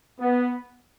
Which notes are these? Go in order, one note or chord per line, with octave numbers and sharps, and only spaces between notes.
B3